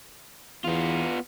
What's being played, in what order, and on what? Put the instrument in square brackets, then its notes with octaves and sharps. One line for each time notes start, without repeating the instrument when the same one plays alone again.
[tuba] E2 [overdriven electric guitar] B3 F4